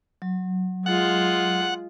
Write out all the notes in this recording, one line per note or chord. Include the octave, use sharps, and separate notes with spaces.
F#3
G#3 F4 F#5